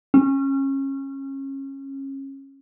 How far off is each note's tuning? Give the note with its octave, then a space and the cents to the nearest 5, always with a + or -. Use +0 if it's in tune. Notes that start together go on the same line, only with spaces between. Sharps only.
C#4 -25